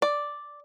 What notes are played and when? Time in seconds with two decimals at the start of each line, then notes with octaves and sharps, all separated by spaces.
0.02 D5